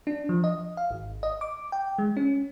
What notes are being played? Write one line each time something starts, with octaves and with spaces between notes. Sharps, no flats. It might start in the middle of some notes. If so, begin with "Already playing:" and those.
D4
F3
D#5
F5
G#1
D#5
D6
G5
G#3
C#4